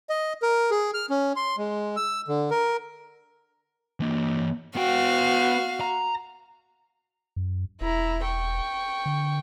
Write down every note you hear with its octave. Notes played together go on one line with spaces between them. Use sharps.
D#5
A#4
G#4
F6
C#4
C6
G#3
E6
D3
A#4
E3 A#3
B3 F#4 F5 G5
A#5
F#2
E1 E4 A#5
G5 C#6
D3